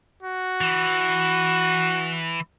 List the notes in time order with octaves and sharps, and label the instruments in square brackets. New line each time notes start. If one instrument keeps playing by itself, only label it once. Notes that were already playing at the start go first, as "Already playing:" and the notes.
[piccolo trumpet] F#4
[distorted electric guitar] E3